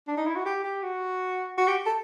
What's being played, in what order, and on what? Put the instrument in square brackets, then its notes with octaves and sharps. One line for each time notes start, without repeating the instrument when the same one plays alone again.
[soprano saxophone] D4
D#4
E4
F#4
G4
G4
F#4
F#4
G4
A4